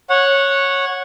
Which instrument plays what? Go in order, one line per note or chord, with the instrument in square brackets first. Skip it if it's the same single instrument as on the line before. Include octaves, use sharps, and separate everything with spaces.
[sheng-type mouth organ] C#5 F#5